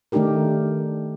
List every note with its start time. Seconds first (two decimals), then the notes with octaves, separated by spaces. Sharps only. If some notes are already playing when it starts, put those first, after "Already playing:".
0.12 D#3 A3 D4 D#4 G4 A#4